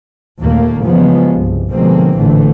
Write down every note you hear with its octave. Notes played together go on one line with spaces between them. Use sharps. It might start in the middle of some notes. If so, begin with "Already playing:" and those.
D#2 A#2 A3 A#3
C#3 E3 F3 G3 G#3 B3
C2 G2
B2 D3 F3 G#3 A#3 C4
A1 A#2 D3 E3 A3